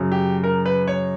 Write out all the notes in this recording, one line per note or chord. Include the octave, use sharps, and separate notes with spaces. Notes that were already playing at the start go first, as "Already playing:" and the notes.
Already playing: F#2 C#3 F#3
G4
A#4
B4
C#5